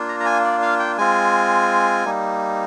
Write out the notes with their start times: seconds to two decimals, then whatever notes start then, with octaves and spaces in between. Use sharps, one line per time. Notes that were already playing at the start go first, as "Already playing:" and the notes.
Already playing: A#3 D4 F4
0.09 A#5
0.20 A#5
0.26 G#5
0.44 D5
0.62 F5
0.79 G5
0.98 G#3 C4 F4 G#5
2.05 G3 A#3 D#4